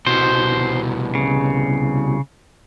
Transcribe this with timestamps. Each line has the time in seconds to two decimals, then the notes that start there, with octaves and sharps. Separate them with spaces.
0.07 C2 B2 C5
1.15 C#3